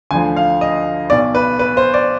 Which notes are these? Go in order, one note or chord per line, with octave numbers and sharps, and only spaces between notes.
D2 D3 F3 G#5
F5
D#5
B1 B2 D5
B4
B4
C5
D5